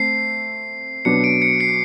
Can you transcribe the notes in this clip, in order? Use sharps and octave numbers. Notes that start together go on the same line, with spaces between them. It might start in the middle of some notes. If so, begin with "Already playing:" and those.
Already playing: A3 C4 C7
B2 F#3 B3 D4 C#7
D7
C#7
C7